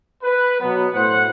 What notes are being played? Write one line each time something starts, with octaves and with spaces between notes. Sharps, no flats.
B4
B2 F#3 B3
A2 C5 F#5